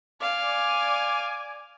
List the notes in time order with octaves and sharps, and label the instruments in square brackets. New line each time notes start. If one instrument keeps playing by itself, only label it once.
[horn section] D5 G#5 [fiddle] F5